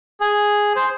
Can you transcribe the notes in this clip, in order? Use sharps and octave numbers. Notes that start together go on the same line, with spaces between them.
G#4
C5